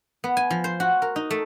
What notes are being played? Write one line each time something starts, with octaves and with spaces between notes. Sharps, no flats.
B3
G#5
F3
C5
F#4
A#4
D#4
A3